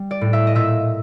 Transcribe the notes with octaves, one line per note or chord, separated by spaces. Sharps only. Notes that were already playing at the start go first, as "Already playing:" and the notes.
Already playing: G3
D5
A2
E5
D#5
A#2 E5